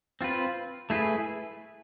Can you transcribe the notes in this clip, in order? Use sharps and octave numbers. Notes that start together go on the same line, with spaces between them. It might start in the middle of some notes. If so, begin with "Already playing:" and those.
C4 F4 B4
A3 E4 G#4 B4